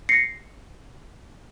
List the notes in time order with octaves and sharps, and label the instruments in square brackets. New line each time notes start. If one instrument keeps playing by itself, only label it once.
[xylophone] A#6 C7 C#7